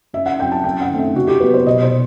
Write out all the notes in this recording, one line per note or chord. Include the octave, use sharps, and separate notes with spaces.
F#2 E5
F#5
F#3 C4 G5
A5
F#2 G5
F#5
D#3 A3 C4
E5
C3 F#4
G4
F#3 B3 B4
C5
B2 D#5
C5